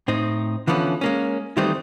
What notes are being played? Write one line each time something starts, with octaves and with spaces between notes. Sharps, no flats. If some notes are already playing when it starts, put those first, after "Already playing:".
A2 C4 D#4
D3 E3 F3 B3 C#4
G#3 A#3 C#4
D#3 E3 G3 A3 C4 D#4